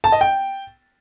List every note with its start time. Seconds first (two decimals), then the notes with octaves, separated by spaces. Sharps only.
0.04 A5
0.12 D#5
0.21 G5